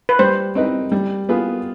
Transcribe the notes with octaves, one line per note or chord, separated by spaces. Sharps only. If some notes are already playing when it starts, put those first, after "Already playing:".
B4
G3 C5
C4 D#4 B4
G3
B3 F4 G#4 B4